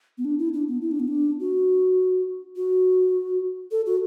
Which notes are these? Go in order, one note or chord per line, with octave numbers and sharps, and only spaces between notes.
B3
D4
E4
D4
B3
E4
D4
B3
D4
F#4
F#4
A4
F#4